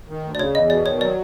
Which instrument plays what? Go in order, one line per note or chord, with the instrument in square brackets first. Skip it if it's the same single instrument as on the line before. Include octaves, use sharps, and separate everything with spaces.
[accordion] D#3
D2
[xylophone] D5
[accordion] C#3 [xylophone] C#5
[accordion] E2 [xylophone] D#5
[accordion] B2 [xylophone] D5
[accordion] D#3 [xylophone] C#5
[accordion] F#3 [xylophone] D5